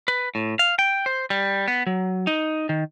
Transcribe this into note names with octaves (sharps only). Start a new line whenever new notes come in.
B4
A2
F5
G5
C5
G3
B3
F#3
D#4
D#3